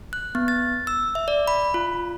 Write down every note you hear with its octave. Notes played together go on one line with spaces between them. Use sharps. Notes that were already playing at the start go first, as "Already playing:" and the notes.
F#6
B3
A6
E6
E5
D5
B5
F4